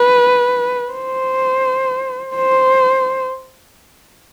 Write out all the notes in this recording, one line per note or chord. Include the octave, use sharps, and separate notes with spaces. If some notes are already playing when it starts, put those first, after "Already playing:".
Already playing: B4
C5
C5